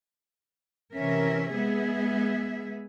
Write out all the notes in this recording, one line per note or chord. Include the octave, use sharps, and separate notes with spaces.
C3 E3 C#4 A#4 E5
G#3 B3 G#4 E5